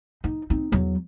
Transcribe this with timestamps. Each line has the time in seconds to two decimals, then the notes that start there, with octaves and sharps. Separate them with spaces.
0.24 D#4
0.50 C4 D#4
0.72 E2 F#3